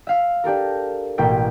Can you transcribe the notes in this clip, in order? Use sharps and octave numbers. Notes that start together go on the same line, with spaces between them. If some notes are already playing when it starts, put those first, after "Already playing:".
E5 F5 F6
D4 G4 A4 A#4
A1 B2 A#3 E4 G5 B6